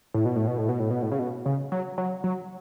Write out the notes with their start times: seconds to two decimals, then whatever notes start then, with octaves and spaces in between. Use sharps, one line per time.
0.14 A2
0.25 B2
0.36 A2
0.47 B2
0.58 A2
0.69 B2
0.80 A2
0.91 B2
1.02 A2
1.12 C#3
1.19 B2
1.46 C#3
1.72 F#3
1.98 F#3
2.24 F#3